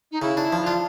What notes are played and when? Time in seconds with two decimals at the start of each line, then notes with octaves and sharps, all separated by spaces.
0.12 D#4
0.22 C#3 E4
0.37 D4 E4
0.52 F3
0.62 D4 F4